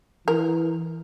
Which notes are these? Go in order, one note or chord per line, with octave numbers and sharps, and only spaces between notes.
E3 A#4